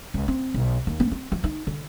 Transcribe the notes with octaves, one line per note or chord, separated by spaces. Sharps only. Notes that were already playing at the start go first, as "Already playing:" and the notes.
C#2
C4
B1
D#2
B3
C4
F3
D#4
D3